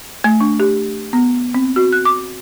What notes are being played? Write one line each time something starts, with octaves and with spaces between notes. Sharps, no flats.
A3
D4
G4
B3
C4
F#4
F#6
D6